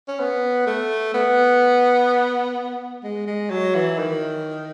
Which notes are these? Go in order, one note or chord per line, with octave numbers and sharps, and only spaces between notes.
C#4
B3
A3
B3
G#3
G#3
F#3
E3
D#3